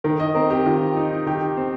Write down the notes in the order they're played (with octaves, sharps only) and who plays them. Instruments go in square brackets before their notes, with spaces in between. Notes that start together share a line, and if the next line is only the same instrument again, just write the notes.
[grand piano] D#3 [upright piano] A#4
[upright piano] D#5
[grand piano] C4 [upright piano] A#4
[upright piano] G4
[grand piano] D#3 [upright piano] F4
[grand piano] D#4
[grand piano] D#3 [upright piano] G4
[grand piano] C4